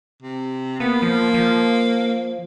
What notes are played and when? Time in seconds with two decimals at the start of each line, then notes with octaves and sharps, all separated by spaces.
0.22 C3
0.80 A#3 B3
1.02 F3
1.34 F3